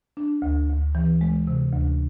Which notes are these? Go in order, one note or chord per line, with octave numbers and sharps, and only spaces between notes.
D4
D2
D2
E3
G#3
C3
D2